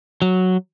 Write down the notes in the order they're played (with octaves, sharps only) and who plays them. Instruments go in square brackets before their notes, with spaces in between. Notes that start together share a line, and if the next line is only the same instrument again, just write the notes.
[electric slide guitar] F#3